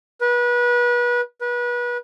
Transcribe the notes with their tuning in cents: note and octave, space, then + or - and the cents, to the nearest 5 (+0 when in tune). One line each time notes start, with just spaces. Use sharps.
B4 -30
B4 -30